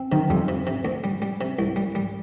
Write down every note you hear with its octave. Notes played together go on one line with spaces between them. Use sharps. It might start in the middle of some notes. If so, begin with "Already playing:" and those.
Already playing: C4
C3 D#3
F2 F3 G3
C3
C3
D2
G3
G3
C3
C2
G3
G3